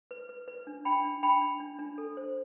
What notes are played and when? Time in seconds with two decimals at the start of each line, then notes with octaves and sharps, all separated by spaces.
0.11 B4
0.29 B4
0.48 B4
0.67 D4
0.85 D4 G5 B5
1.05 D4
1.23 D4 G5 B5
1.42 D4
1.60 D4
1.79 D4
1.98 A4
2.17 C5